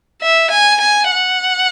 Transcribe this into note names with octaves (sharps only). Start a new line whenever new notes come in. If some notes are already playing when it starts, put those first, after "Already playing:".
E5
G#5
G#5
F#5